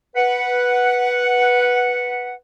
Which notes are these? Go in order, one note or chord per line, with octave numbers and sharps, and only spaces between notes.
B4 F#5